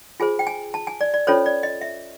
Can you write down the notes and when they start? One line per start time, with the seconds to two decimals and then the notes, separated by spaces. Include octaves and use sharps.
0.20 F4 G#4 C5 G#5
0.39 G5
0.47 G#5
0.74 A5
0.87 G#5
1.01 D5
1.14 D5
1.27 C#4 F4 A4 C5 C#5
1.46 D5
1.63 D#5
1.81 E5